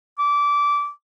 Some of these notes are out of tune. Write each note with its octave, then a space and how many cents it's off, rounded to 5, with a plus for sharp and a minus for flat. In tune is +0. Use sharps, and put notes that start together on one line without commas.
D6 -20